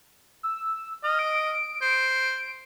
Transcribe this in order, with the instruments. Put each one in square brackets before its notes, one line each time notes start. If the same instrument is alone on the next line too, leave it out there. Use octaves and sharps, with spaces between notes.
[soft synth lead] E6
[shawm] D#5 [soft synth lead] F6
[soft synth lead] D7
[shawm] C5